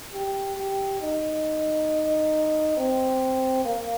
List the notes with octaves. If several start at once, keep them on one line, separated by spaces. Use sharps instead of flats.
G4
G4
D#4
C4
A#3